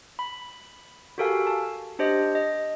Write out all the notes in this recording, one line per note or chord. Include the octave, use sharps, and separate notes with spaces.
B5
F#4 G4 A4 A#4 F5 G#5
A5
D4 G4 C5 D#5
D#5